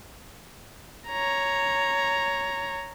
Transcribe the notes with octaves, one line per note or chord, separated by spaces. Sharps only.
C#5 A#5